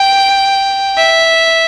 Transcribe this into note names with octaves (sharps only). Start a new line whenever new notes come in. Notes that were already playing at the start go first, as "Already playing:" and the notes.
Already playing: G5
E5